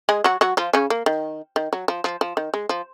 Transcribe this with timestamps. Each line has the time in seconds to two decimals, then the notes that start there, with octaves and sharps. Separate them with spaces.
0.09 G#3 G#4
0.24 F#3 F#4
0.41 F#3 F#4
0.57 F3 F4
0.73 C#3 C#4
0.90 A#3
1.06 D#3
1.56 D#3
1.73 F#3
1.88 F3
2.04 F3
2.21 F3
2.37 D#3
2.54 G#3
2.69 F3